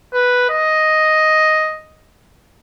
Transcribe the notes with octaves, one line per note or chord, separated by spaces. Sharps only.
B4
D#5